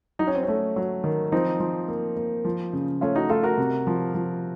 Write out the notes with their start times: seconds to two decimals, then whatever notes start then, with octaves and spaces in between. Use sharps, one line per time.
0.19 F#3 D#4
0.27 C#4
0.35 C4
0.43 C#4
0.48 A3
0.76 F#3
1.04 D#3
1.32 F3 C4 D#4
1.60 F3
1.88 A#3
2.17 A#3
2.45 F3
2.73 C#3
3.01 A3 C#4 F4
3.15 D#4 F#4
3.29 A3 F4 A4
3.43 F#4 A#4
3.58 C3
3.87 F3
4.14 F3